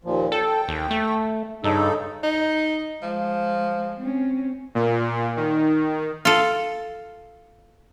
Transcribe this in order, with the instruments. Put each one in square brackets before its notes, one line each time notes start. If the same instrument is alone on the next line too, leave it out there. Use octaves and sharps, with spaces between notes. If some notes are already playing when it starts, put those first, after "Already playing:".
[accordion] D#2 A#2 F3
[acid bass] A4 [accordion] G5
[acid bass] D#2
A3
[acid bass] G2 [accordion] C#3 D#4 A4
[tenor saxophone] D#4
[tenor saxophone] F3 [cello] G#3
[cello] C4 C#4
[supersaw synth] A#2
D#3
[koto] F4 A4